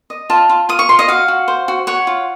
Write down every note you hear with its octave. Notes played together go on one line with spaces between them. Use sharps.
D#5
F4 A5
F4
F4 D#6
C#6
F4 C6
D#5
F#4 F5
F#4
C5
F#4
C#5 F#5
F4